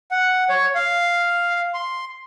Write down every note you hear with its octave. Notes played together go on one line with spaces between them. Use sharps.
F#5
C#5
F5
C6